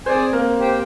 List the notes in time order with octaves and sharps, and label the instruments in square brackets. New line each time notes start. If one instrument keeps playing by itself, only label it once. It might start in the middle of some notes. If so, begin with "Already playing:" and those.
[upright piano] C4 C5 [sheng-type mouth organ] G#4 D5 G#5
[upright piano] A#3 A#4
[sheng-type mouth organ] G4 C5 G5